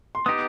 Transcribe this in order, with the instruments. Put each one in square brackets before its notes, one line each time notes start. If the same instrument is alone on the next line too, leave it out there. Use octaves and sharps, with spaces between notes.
[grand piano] C6
[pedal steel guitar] B3 D#4 G4 [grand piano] D#6